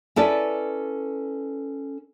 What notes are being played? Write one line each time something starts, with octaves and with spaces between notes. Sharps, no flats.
C#4 E4 A4 B4 D5